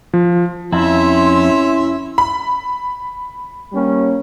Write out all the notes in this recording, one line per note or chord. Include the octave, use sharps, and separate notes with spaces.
F3
F2 C#4 E4 E5 C6
B5
G3 A#3 C#4